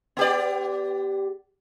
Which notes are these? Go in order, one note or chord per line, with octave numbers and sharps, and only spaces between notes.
B3 G4 D5